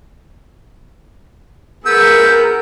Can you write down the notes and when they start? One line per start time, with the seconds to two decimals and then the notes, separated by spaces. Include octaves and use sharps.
1.86 B3 G#4 A#4 E6 G6